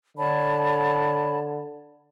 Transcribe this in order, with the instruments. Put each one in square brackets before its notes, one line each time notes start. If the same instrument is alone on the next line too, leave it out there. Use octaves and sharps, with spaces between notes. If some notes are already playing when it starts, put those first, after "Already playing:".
[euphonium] D3 [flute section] C#5 A5 B5